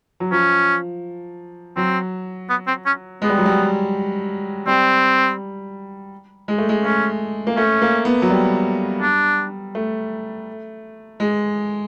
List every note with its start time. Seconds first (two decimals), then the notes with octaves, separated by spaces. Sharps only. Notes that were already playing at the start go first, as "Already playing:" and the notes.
0.20 F#3
0.31 F3 C#4
1.76 F#3 C4
2.50 B3
2.67 C4
2.86 C#4
3.22 G#3 B3
3.30 G3
3.38 F#3
3.46 G3
4.67 G3 C4
6.48 G#3
6.58 A3
6.69 G#3
6.85 A3 C#4
7.47 A#3
7.57 A3 C#4
7.81 A#3
8.05 B3
8.22 F#3
8.30 G3
9.02 D4
9.75 A3
11.20 G#3